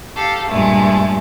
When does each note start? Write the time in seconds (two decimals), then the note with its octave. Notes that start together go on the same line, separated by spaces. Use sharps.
0.15 G4 A4 F5
0.48 G2 A#2 G#3 A3